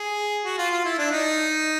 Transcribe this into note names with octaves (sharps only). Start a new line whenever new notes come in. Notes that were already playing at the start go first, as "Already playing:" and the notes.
Already playing: G#4
F#4
F4
F4
E4
D4
D#4